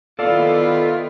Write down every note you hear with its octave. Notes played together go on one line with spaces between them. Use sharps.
D#3 B3 E4 F4 A4 D5 F5